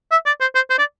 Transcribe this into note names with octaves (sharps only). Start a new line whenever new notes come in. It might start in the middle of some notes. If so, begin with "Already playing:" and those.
E5
D5
C5
C5
C5
D5